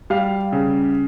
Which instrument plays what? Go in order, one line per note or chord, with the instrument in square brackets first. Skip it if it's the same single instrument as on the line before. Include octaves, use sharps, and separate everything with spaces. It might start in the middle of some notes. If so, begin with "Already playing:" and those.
[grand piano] G3 F5
C#3